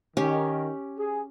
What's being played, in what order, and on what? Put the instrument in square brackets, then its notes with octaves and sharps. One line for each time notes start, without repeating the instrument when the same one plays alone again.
[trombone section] D#3 [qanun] C#4 G4
[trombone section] G#4